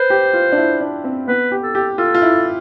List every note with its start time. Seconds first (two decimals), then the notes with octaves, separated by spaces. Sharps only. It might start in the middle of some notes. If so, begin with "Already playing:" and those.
Already playing: B4 C5
0.10 G4
0.33 F4
0.52 D4
0.57 E4
0.81 D4
1.04 C4
1.28 B3 B4
1.52 G4
1.63 A4
1.75 G4
1.98 F4 A4
2.15 F4
2.22 E4